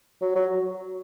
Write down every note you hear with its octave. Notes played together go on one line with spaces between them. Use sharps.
F#3
F#3